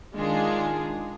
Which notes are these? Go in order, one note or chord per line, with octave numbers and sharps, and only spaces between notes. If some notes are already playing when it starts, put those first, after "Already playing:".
D#3 G#3 D4 F4 G#4